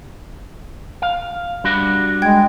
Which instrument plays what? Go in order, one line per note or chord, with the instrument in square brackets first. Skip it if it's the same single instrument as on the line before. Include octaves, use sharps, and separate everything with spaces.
[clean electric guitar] F5
G3 D4 F#4
[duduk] G#3 [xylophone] G5 G#6